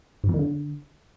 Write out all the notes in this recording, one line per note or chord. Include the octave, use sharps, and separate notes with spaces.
G#2
F2
D#3
D3